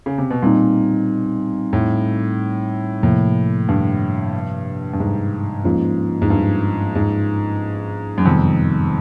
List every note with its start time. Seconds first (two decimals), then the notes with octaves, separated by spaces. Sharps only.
0.06 C#3
0.18 C3
0.30 B2
0.42 A#2 G3 C4 D#4
1.73 A2
3.03 A2 C3 F3 A#3
3.69 G2
4.93 G2
5.00 G#2
5.64 G#2 F3 A#3 C#4 F4
6.22 G#2
6.30 G2
6.95 G#2
8.18 F#2
8.25 F2 C3 D#3 G3 B3